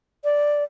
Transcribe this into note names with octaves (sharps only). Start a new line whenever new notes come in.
D5